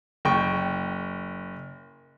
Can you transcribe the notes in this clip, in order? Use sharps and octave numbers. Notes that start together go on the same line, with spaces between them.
F#1 G5 C#6